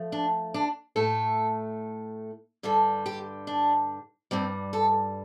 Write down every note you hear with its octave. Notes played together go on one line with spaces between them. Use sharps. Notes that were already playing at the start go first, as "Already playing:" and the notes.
Already playing: F3 A3
D4
D4
A2 A3 A4
G2 D3 G3 A4
G4
D4
G2 G3 C4
A4